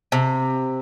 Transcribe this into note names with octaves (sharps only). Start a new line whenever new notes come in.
C3